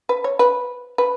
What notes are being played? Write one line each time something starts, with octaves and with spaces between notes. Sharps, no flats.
B4
C#5
B4
B4